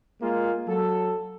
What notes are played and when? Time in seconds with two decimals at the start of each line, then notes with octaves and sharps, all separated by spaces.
0.22 G#3 A#3 F4 G#4
0.68 F#3 A4